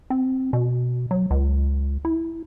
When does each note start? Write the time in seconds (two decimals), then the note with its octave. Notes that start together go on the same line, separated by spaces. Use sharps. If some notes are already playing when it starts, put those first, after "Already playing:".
0.10 C4
0.53 B2
1.11 F#3
1.31 C#2
2.05 E4